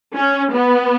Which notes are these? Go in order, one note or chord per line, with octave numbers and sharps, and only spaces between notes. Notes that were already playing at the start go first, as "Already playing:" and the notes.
C#4
B3